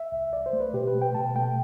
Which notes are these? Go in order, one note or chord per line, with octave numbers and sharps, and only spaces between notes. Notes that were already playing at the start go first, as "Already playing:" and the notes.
Already playing: E5
C2
C2 D5
C5
A3
B4
B2 G4
B4
A3
G5
B2 A5
A3 G5